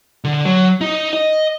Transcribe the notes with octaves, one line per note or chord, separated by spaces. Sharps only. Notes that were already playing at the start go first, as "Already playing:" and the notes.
D3
F#3
D#4
D#5